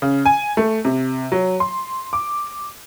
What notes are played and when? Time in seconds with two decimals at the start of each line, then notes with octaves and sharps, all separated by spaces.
0.02 C#3
0.25 G#5
0.57 A3
0.85 C3
1.32 F#3
1.60 C6
2.13 D6